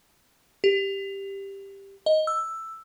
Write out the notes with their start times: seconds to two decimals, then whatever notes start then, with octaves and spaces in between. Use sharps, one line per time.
0.64 G4
2.06 D#5
2.27 E6